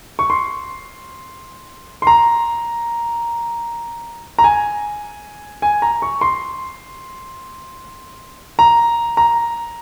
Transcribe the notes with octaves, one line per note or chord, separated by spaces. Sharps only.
C#6
C6
C6
A#5
A#5
G#5
G#5
A#5
C#6
C6
A#5
A#5